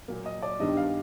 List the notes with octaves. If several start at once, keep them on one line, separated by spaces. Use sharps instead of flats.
A#2 F#3 A#3
D#5
D5
G2 D#3 G3 B3 D4 D#5
F5